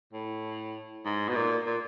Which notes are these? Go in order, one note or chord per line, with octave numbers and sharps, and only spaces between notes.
A2
G#2
B2
A#2
A#2